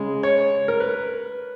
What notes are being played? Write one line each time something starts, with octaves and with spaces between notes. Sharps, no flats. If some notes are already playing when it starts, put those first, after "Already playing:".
Already playing: C#3 G#3
C#5
A#4
B4